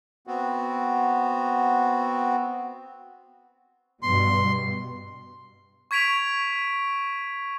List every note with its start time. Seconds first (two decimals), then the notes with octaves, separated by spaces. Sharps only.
0.27 B3 C4 F#4
4.03 G2 B2 C6
5.91 C#6 G#6 B6 D7 F7